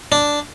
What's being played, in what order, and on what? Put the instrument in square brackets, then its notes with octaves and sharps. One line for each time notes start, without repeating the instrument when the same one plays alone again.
[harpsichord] D4